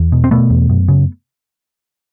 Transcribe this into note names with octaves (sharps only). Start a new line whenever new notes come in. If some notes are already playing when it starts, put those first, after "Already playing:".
Already playing: E2
B2
C4
B2 A3 B3
E2
F#2
C#3